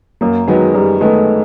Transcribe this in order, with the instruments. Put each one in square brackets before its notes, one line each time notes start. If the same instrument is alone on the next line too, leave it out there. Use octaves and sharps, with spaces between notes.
[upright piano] F#2 [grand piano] A#3
[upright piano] D#3 G#3 B3 [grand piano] F#3
[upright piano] F#2 [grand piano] G3
[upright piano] D#3 G#3 B3 [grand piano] A3